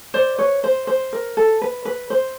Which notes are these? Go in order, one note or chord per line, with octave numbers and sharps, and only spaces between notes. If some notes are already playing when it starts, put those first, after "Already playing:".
C5 D5
B4 C#5
C5
C5
A#4
A4
B4
B4
C5